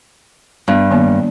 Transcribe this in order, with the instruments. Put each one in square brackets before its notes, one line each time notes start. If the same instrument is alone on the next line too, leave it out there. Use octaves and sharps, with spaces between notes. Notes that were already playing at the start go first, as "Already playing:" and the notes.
[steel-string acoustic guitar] G2 [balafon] B3
[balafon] D#3 A#3 B3